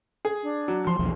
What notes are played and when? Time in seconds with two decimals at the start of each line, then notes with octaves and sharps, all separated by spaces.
0.25 G#4
0.43 D4
0.68 F#3
0.87 F3 C6
0.99 B1 E2 F3